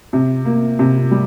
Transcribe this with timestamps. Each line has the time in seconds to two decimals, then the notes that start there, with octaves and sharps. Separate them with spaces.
0.13 C3
0.45 A#3
0.79 C3
1.11 G3